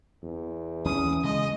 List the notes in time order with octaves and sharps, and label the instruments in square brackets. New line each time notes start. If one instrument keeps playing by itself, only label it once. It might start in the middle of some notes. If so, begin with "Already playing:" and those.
[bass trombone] E2
[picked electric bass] D#2 E3 C#4 [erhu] D#6
[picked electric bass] C#3 G#3 [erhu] D#5